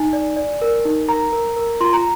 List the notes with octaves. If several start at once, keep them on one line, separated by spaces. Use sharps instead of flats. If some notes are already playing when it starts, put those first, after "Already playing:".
Already playing: D#4 G#5
D5
D5
A#4
D#4
A#4 A#5
A#4
A#4
F4 C6
A#5